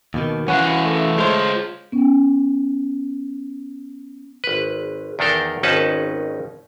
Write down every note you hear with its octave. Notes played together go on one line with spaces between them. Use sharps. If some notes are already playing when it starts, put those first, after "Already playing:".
D#2 B2 D#3
E3 C#4 E4 F#4 F5 F#5
A3
G#3 F4 C5 C#5
B3 C#4
G#1 B4
E2 D#3 D4 A4 A#4 G5
G#1 D#2 C#4 D#4 B4 A5